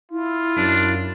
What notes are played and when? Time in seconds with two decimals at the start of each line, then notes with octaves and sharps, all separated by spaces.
0.12 E4 F4
0.57 F#2 D4